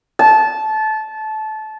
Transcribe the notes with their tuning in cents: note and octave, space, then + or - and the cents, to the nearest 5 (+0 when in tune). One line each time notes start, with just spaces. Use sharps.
A5 -20